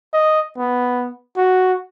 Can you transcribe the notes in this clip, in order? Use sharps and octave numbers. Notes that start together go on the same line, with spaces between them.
D#5
B3
F#4